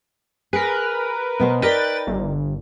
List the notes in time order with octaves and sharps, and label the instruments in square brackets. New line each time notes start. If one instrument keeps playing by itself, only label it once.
[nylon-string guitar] G#4 [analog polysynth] A#4 B4
[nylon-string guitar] B2 B3 C5
[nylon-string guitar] D#4 A#4 D5 [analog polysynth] B4 G5 A6
[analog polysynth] G1